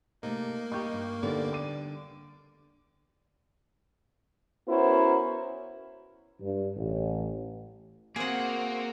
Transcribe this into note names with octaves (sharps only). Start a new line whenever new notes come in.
C3 A3 A#3 D#4
G3 D#4 G4 C#6 G6
G2
D3 G3 B3 D#4 A4 D5
D6 D#7
B3 C#4 E4 F#4 A#4 C5
G2
A1
A#3 C4 F#4 G#4 A#4 C5 F#5